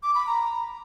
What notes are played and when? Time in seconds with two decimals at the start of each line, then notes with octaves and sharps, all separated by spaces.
0.03 D6
0.15 B5
0.27 A#5